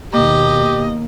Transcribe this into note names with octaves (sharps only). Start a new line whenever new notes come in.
D#2 B2 A#3 G4 D#5